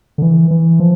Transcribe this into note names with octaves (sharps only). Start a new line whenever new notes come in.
D3
E3
E3
F3